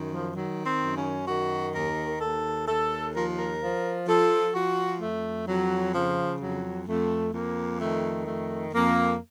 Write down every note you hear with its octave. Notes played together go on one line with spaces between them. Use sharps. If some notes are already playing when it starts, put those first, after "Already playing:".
Already playing: F#2 D#3
F3
D#3 F#3
C4
F#2
C#4
D#3 F#4
D#2 A#4
D#2 A4
D#2 A4
F3 A#4
A#4
F3
F3 A4
F3 F#4
F2 A3
F2 F#3
C#3 F3
F2 F#3
F2 A3
F2 A#3
D#3 A3
F2 A3
F2 A#3